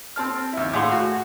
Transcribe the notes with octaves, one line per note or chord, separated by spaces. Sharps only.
C4 A5 F6
D#2 E4
A2 G#4 F5 F#5 C6 C#6
F#4